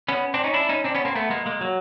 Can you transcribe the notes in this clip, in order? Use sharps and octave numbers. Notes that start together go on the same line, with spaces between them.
B3 C#4
C4 D4
C#4 D#4
D4 E4
C#4 D#4
C4 D4
B3 C#4
A#3 C4
A3 B3
G#3 A#3
G#3 A#3
F#3